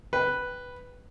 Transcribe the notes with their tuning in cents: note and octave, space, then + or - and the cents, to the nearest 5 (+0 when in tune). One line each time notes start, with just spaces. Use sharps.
B4 +0 G5 +0